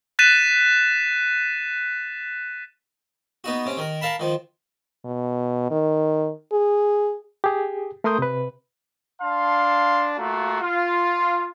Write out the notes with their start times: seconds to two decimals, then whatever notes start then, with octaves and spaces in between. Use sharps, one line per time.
0.19 F#6 A6 B6 D#7 E7
3.44 B3 D#4 F#4
3.66 C3 C#4
3.77 D#3 A#4
4.01 A#4 F5 A5 B5
4.20 D#3 F3
5.05 B2
5.71 D#3
6.52 G#4
7.44 G4 G#4
8.04 A3 A#4 C6 D#6 G6
8.19 C3 B4
9.22 D4 F5 A5 C6
10.19 A3 A#3 F4 F#4
10.62 F4